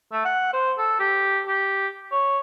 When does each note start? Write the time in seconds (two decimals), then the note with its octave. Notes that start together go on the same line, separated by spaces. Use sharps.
0.12 A3
0.25 F#5
0.53 C5
0.78 A4
1.00 G4
1.47 G4
2.12 C#5